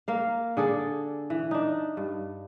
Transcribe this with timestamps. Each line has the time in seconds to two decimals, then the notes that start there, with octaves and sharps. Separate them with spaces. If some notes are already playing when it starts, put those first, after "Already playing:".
0.08 A#3 F5
0.57 D3 G#4 A4 D5
1.30 E3
1.51 D4 D#4
1.97 G2